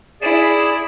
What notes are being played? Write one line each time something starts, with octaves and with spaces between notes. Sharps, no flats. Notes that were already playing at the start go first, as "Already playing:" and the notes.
E4 G#4 D5